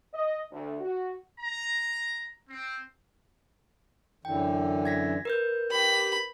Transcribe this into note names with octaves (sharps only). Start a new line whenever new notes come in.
D#5
D2
F#4
A#5
C4
F#2 D3 E3 G5
G#6 A#6 B6
A#4 B4 G6
G4 B5